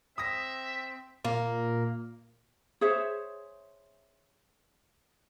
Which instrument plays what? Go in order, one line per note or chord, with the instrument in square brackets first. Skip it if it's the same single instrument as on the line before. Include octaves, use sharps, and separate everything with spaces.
[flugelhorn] C4 [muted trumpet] E5 [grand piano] D#6 A#6
[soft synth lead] A#2 [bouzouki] A#3
[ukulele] G#4 C5 C#5 E5